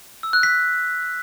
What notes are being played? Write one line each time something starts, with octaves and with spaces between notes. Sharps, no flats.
E6
F#6
B6